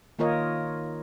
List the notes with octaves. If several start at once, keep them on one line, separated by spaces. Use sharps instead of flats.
D#3 A#3 F4 A#4 C#5 D#5